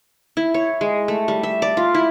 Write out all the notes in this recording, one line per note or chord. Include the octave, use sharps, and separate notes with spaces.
E4
C#5
G#3
A3
G3
E5
D5
F4
E4